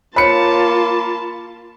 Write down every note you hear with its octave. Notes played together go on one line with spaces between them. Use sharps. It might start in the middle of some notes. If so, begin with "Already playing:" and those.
A#3 F4 C5 C#5 A5 B5 C#7